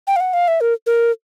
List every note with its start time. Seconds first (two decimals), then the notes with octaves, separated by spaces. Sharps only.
0.07 G5
0.16 F5
0.20 F#5
0.33 F5
0.48 E5
0.61 A#4
0.87 A#4